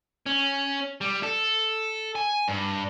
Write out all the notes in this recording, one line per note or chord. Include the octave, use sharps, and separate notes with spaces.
C#4
G3
A4
G#5
G2